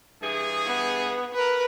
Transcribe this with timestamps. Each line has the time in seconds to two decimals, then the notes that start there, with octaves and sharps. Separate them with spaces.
0.22 G2 E3 G#4
0.66 B3
1.34 A#4 B4